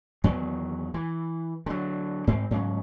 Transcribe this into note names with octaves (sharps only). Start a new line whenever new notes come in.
E2 D#3 F#3
E3
D3 F#3
G#2 C4
G#2 C#3 F#3